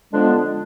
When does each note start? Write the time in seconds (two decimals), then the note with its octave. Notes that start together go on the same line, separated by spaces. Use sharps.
0.13 D3 F3 G#3 B3 D4